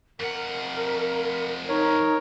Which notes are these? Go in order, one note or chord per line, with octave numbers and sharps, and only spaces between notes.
F2 A#4 F#5
D#4 A#4 C#5